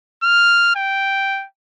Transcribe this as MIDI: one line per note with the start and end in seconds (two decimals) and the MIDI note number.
0.23 0.71 89
0.76 1.45 79